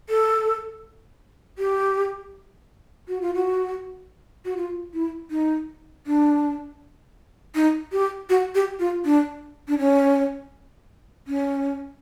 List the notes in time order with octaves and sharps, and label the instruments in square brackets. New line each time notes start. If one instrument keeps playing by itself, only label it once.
[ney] A4
G4
F#4
F4
F#4
F#4
F4
E4
D#4
D4
D#4
G4
F#4
G4
F4
D4
D4
C#4
C#4